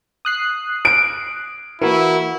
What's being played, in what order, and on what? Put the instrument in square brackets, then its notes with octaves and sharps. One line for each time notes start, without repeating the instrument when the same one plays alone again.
[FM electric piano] D#6 F#6 C7
[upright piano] D7
[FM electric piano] E3 [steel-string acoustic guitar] A#3 F#4 A#4 [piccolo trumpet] E4